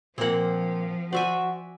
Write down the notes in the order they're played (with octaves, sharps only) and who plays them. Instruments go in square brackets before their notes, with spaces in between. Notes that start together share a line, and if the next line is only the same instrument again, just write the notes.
[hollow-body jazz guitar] A#2 A#3 [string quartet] F3 [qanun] C4 F#5
[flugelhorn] F#4 [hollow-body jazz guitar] C5 [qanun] D5 E5 G#5